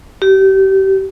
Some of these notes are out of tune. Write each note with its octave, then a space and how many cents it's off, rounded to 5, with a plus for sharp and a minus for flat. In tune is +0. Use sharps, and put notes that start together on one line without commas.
G4 -30